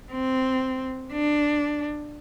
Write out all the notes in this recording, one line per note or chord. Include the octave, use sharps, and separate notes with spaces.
C4
D4